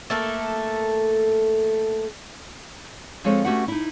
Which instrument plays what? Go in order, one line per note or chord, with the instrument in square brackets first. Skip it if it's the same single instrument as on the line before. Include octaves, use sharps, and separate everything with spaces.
[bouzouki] A3 A#3 A4
[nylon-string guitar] F3 G#3 C4 F4 A4 C#5
A3 C#4 F#4 G4 B4 F#5
D#4 E4